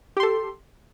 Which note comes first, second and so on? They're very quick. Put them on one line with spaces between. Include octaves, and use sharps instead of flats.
G4 C6 A4